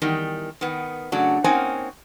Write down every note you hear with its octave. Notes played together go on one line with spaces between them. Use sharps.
E2 D#3 G3
D#3 B3
C#3 F#3 A3 D4 F#4
A#3 C4 C#4 D#4 F#5 G#5